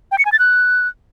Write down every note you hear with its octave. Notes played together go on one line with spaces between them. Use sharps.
G5
C#7
G#5
A6
F#6